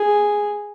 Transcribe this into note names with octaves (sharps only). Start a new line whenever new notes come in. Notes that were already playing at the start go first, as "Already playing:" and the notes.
Already playing: G#4